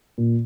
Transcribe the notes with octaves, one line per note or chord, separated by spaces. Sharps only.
A#2